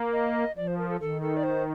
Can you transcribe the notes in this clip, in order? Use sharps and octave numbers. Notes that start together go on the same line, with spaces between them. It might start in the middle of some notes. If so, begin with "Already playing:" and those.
Already playing: A#3
D#5
F3 D5
C5
A#4
A4
D#3 A4
A4
D5
C5